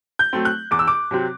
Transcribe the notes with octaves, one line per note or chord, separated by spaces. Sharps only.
G6
F#3 A3 C4
F#6
E2 D6
E6
D6
C3 F#3 C4